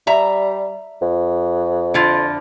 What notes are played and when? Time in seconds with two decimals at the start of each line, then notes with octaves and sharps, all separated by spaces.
0.07 G3 E5 A#5
1.02 F2
1.94 D3 E4 F4